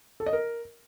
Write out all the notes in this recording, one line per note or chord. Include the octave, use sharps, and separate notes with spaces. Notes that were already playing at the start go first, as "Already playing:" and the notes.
A4
D#5
A#4